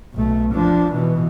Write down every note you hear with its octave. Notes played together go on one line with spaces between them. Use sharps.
B1 A3
F3 D4
B2 E3